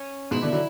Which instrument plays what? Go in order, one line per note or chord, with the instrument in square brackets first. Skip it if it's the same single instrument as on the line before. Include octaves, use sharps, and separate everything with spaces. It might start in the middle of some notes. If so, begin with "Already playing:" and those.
Already playing: [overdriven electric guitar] C#4
[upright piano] G#2 B2 [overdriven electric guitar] E4
[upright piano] B2 D3
D3 F#3